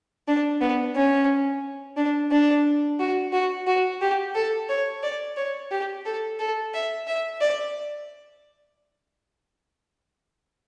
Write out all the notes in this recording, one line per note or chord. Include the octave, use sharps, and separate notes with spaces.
D4
B3
C#4
D4
D4
F#4
F#4
F#4
G4
A4
C#5
D5
C#5
G4
A4
A4
E5
E5
D5